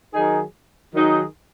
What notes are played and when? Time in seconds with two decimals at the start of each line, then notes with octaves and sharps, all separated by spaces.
0.13 D#3 F#3 D#4 G#4
0.93 D#3 F#3 D#4 G#4